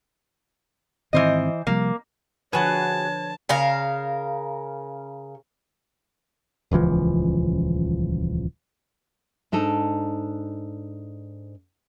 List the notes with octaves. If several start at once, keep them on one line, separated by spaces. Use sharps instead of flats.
G#2 D#3 E3 C4 C5 D#5
C3 F3 G3 A#3
D3 F3 F#4 G#4 B4 C#5 A5
C#3 A#4 F5
D#1 C#2 E3 F3
G#2 D4 D#4 A4